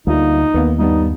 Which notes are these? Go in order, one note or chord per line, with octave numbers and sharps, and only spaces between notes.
D2 G3 A#3 D#4 F4
D#2 A#3 B3 B4
G2 G3 B3 D#4